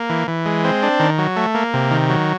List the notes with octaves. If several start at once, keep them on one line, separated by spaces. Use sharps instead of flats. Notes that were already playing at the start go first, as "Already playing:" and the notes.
Already playing: A#3
E3
E3
G#3
C4
D4
D#3
F#3
A3
A#3
C3
D#3
F#3